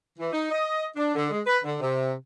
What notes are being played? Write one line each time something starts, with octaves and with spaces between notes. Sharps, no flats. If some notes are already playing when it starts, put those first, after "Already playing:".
E3
D#4
D#5
D4
D3
G#3
B4
D3
C3